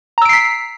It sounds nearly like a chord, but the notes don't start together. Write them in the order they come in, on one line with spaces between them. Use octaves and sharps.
A#5 E6 D7 C7 B6